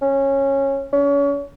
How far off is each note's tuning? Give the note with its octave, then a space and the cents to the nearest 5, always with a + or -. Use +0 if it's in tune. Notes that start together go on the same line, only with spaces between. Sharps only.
C#4 -15
C#4 +35